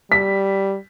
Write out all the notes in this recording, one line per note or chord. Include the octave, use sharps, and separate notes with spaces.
G3 B6